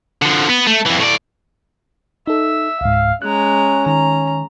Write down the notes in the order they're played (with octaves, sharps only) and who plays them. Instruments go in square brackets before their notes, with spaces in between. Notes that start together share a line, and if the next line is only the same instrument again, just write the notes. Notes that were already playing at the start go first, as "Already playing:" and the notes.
[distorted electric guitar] D3 F3
B3
A3
F2 E3
A2 D5
[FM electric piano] D#4 A4 [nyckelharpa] E5
[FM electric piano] C#2 G#2 [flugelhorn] F5
[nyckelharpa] G#3 A#5 [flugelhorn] C#4 [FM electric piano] F#6
[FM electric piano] D#3 [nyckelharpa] A#5